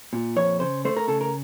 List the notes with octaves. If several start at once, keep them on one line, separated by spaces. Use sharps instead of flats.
A#2
F2 C#5
C#3 C5
A3 C5
A#4
C#3 A4
A#4